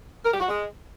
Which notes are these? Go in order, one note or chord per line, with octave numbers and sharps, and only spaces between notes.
A#4
G4
F#4
G#3